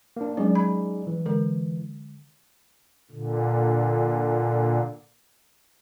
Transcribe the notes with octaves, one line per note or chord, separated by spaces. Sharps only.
A#3 D4
F#3 G#3 C#4 D#4 G#4 D5
B5
E3
D3 G#3 A#4
A#2 D3